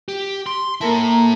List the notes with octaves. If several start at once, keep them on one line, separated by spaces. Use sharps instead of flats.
G4
C6
A#3 E4 A4 A#4 A5
A#3